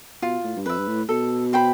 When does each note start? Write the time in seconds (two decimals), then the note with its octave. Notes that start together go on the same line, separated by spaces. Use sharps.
0.22 B2 F4
0.44 A2
0.56 G2
0.66 F2 B4 E5
0.78 G2
0.88 A2
1.09 B2 A4
1.53 C5 G5 B5